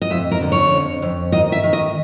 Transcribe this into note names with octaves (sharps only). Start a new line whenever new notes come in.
D#5
F2 E5
A#4
D3
C#5
F2
F2
D#3 D#5
E5
D#3
D#5